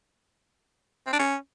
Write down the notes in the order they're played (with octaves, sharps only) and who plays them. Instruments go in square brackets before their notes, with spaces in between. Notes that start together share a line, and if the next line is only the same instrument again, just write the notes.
[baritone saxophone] C4
D4
C#4